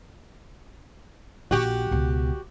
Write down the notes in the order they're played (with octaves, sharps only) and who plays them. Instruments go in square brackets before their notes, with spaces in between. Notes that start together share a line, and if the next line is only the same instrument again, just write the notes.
[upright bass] A#1 [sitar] F#4 G4
[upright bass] C#2 B2